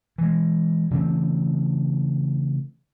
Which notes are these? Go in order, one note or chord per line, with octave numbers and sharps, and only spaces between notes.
E3 G#3
C#3 E3 A3 C4